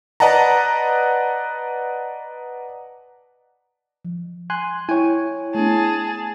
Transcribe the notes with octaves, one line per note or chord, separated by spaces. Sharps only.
B4 D5 D#5 F#5 A5 A#5
F3
G#5 C6 F#6
E4 C#5 G5 G#5
A3 B3 D4 G#4 A5